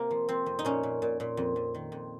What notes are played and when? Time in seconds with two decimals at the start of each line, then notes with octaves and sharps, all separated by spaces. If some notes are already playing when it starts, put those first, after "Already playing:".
Already playing: C3 A#3
0.11 F3
0.29 F3 C4
0.46 F2
0.59 D#4
0.65 A#2 C#4
0.83 A#2
1.02 A#2
1.20 A#2
1.37 F2
1.56 F2
1.75 D#3
1.92 F2